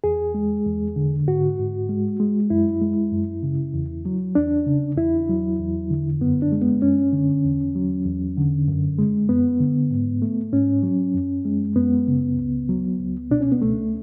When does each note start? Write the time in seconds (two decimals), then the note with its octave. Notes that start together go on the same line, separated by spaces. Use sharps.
0.04 E2 G#4
0.34 G#3
0.66 E2
0.96 D3
1.28 G#2 F#4
1.59 G#2
1.89 G#3
2.20 G#3
2.50 F#2 E4
2.81 G#3
3.12 F#2
3.43 C#3
3.74 E2
4.05 F#3
4.35 E2 D4
4.66 C#3
4.97 E2 E4
5.29 F#3
5.59 E2
5.90 D3
6.21 F#2 B3
6.42 D4
6.52 G#3
6.62 B3
6.82 F#2 C#4
7.13 D3
7.45 E2
7.75 F#3
8.06 E2
8.37 D3
8.68 F#2
8.99 G#3
9.29 F#2 B3
9.60 D3
9.91 G#2
10.22 A3
10.53 G#2 C#4
10.83 F#3
11.14 F#2
11.45 G#3
11.76 F#2 B3
12.08 C#3
12.37 C#2
12.69 F#3
13.00 C#2
13.31 B2 D4
13.41 C#4
13.52 B3
13.61 C#2 A3